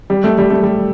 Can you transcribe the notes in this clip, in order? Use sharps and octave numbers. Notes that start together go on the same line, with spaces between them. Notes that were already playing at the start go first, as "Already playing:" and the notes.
G3
A3
G3
A3
G3